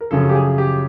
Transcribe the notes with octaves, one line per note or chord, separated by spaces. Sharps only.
A#4
F#2 C#3 F3 A4
G4
G#4
G4